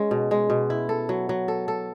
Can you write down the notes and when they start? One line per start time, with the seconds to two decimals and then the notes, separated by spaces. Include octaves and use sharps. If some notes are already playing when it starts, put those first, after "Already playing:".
Already playing: G#3 C#4
0.11 B2
0.31 G#3
0.50 B2
0.70 E4
0.89 A4
1.09 F#3
1.29 F#3
1.48 A4
1.68 A4